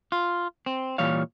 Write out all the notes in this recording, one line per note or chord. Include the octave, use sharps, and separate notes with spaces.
F4
C4
A#2 E3 G3 C#5 F5